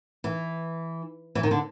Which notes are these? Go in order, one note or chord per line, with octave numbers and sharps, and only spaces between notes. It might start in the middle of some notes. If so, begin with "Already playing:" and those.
E3
E3
D#3
D3